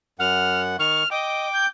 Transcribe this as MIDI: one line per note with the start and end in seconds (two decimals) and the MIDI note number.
0.19 0.76 42
0.19 0.76 78
0.19 0.61 89
0.79 1.03 51
0.79 1.03 85
0.79 1.11 89
1.11 1.47 75
1.11 1.66 79
1.11 1.66 86
1.53 1.67 91